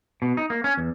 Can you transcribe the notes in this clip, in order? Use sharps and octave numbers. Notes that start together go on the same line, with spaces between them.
B2
D#4
A#3
C#4
E2